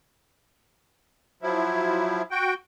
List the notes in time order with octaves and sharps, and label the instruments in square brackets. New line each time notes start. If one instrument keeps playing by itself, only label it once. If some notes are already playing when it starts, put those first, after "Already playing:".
[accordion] F3 F#3 E4
F#4 G5